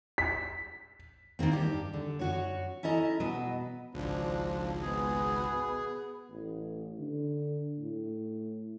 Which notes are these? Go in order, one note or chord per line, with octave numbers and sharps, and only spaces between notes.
B6
D#3 E3 A#3 C4
G2 D4 G4
D3
F#2 F#4 C#5
C#4 E4 A4 D#5 A#5
B2 F#3 B4 D#5
G#1 C#2 F3 D4
G#3 B3 G#4
B2
A1
D3
A2